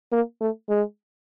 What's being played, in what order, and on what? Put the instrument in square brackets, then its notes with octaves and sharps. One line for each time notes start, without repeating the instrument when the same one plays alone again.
[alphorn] A#3
A3
G#3